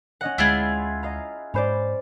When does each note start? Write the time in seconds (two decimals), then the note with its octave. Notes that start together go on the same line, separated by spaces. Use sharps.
0.21 C#4 D#5 F#5
0.38 D2 G#3 E4 F4 G#4
1.03 D#5 F5 A#5
1.54 G#2 C#4 C5 D5 B5